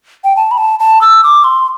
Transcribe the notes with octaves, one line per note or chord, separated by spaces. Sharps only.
G5
A5
B5
A5
A5
E6
D6
C6